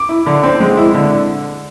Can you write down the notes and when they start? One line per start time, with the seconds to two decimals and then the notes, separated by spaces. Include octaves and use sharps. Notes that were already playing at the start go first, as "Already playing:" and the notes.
Already playing: D6
0.09 E4
0.26 D3
0.43 C4
0.60 G#3
0.77 E4
0.94 D3